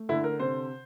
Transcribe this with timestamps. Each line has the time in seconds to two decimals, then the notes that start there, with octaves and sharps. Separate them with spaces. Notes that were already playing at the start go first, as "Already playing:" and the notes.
Already playing: A3
0.09 D3 E4
0.24 A#4
0.39 C3 C5